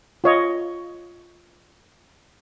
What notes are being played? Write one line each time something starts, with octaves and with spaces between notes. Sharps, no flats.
F4 C#5 D#5